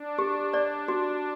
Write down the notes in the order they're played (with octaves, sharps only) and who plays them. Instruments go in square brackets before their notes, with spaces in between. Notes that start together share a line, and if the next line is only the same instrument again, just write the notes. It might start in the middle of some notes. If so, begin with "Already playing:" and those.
Already playing: [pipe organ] D4
[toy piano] G4
D5
F#4